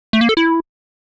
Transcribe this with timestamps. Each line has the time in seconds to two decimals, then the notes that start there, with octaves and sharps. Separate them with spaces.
0.13 A3
0.21 A#3
0.29 A4
0.37 E4